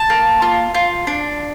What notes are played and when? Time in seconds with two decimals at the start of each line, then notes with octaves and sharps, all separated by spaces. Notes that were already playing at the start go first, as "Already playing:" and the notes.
Already playing: A5
0.10 A#3
0.42 F4
0.74 F4
1.07 D4